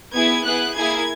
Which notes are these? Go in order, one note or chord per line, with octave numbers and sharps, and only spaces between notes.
B3 E4 G#4 G#6
B3 E4 G#4 F#6
A#3 E4 G#4 G#6